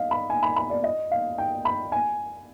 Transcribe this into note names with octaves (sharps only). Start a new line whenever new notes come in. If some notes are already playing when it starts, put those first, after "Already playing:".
Already playing: D#5 F5
B5
G#5
B5
B5
D5
D#5
F5
G5
B5
G#5